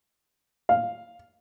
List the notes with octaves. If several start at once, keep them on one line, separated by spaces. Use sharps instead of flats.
F5